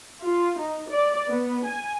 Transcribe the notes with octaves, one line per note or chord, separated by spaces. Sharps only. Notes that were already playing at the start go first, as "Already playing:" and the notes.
F4
D#4
D5
B3
G#5